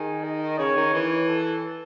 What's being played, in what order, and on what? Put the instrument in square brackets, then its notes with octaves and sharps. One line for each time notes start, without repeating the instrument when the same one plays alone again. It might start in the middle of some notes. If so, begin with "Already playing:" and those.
Already playing: [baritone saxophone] D#3 [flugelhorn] G#4
[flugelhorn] D#5
[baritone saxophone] C#3 [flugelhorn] C#5
[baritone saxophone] D#3
E3
[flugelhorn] A4